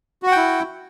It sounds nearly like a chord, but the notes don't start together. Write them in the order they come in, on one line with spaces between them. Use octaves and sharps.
F#4 F#5 G5 E4